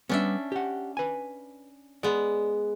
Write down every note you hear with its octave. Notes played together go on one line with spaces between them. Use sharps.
G3 B3 C#4 D4 E5
G4 F#5
B4 G#5
G#3 B3 D5